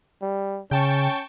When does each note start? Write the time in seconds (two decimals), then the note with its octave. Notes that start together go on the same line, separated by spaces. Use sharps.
0.22 G3
0.71 C#3 C#4 G5 A5 C#6